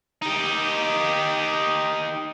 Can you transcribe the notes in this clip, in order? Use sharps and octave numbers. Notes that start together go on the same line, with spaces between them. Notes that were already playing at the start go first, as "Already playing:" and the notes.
D#4 G4